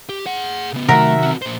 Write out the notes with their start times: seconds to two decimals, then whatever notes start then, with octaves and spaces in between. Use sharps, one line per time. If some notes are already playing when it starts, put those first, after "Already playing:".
0.09 G4
0.26 G#4 F#5
0.73 C#3 B3
0.89 C3 D#3 F#3 A3 A#4 E5 F#5
1.23 C4 F#4
1.42 A#2 C5